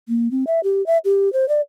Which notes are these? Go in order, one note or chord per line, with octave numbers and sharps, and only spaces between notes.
A#3
C4
E5
G4
E5
G4
C5
D5